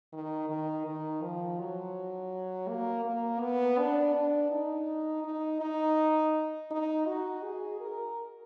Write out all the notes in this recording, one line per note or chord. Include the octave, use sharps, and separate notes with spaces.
D#3
D#3
D#3
F3
F#3
A#3
A#3
B3
D4
D4
D#4
D#4
D#4
D#4
F#4
G#4
A#4